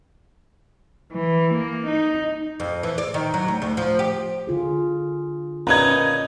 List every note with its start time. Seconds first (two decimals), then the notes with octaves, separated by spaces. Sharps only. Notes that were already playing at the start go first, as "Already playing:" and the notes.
1.13 E3
1.54 A#3
1.87 D#4
2.60 F2
2.83 E3
2.98 D5
3.14 D#3
3.34 F#3
3.48 D2
3.62 D2
3.77 F3
3.99 G4
4.47 D3 F4 G#4
5.67 A#2 B3 C#4 D#4 A#5 G#6